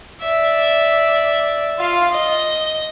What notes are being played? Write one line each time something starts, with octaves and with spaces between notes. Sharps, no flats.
D5 E5
F4 F5
D#5